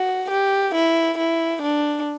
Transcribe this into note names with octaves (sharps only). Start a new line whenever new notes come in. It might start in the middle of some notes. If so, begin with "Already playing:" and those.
Already playing: F#4
G4
E4
E4
D4